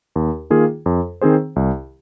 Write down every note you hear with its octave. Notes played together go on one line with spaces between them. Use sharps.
D#2
D#3 A#3 F4 G#4
F2
D#3 C4 G#4 C5
C2